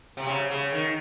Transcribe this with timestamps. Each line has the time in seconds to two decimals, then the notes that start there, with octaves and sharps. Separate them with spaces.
0.17 C3
0.27 C#3
0.50 C#3
0.73 D#3